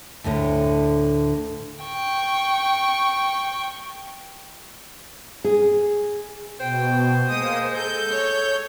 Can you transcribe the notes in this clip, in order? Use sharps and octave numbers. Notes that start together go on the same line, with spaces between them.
D2 A2 D3
G5 C#6
G#4
B2 C5 G5
G#3 A#3 D#6
A4 G6
C#5